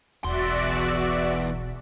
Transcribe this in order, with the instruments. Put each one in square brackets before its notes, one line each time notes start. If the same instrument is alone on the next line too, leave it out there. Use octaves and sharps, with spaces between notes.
[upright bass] E1 B1 [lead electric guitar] E2 C6 [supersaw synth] F#4 D5 E5